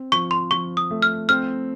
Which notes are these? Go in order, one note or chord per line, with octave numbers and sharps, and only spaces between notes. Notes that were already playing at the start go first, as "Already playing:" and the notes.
Already playing: C4
F3 C#6
C6
F3 C#6
D#6
A3
F6
C4 F6